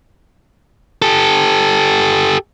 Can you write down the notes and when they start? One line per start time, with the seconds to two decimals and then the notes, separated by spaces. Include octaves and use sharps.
1.02 G4 A4